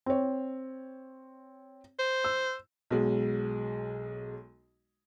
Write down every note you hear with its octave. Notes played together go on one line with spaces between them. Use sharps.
C4 C#5
C5
E6
B1 F#3 G#3